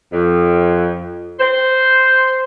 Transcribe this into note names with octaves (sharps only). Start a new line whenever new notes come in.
F2
C5